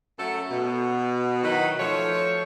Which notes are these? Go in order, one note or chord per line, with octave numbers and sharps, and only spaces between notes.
F#2 F#3 A3 A4
B2
D#3 F#3 D#4 E4 F#4 B4
F3 A3 C#5